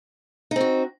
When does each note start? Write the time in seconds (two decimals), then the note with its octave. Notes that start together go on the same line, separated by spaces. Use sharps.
0.51 D#4
0.56 C4
0.61 F#4